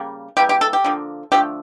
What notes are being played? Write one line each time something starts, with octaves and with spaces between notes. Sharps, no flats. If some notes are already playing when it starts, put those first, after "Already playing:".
Already playing: C#3 G3 A#3
C#3 E3 G3 A#3 G4
G4
A4
G4
D3 F3 A#3
D3 F3 A3 G4